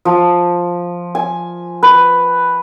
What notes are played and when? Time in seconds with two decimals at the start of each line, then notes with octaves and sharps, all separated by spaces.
0.05 F3
1.15 G#5
1.83 B4